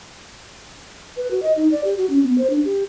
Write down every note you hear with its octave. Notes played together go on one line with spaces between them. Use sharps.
B4
F#4
D#5
D#4
D5
G4
F#4
C#4
B3
C5
D4
G4